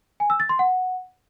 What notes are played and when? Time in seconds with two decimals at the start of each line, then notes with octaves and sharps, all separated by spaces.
0.20 G#5
0.30 E6
0.40 A6
0.49 C6
0.59 F#5